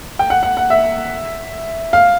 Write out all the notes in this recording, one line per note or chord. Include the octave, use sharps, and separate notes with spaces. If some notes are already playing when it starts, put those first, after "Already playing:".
G5
F#5
F#5
F#5
E5
F5